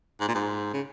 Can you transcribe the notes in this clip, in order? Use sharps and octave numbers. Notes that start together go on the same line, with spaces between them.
G#2
A#2
G#2
C#3